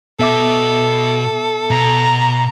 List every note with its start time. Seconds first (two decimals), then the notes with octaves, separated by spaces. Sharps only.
0.20 B2 B3 A4 E5 D6
1.70 B2 A#5